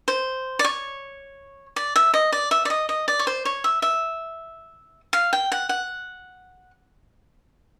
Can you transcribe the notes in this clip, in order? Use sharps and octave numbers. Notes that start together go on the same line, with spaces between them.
C5
D5
C#5
D5
E5
D#5
D5
E5
D5
D#5
D#5
D5
C#5
C5
C#5
E5
E5
F5
G5
F#5
F#5